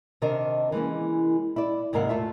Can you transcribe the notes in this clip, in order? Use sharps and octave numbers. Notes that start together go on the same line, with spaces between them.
C3 D#3 D4 A#4 C5 D#5
E3 G#3 A#3 C#4
E4 D5
D#2 G#2 C3 A#4 F5 F#5
A3 F4 E5